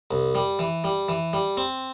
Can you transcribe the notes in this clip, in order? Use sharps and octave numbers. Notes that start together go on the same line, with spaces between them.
C2
G3
E3
G3
E3
G3
C4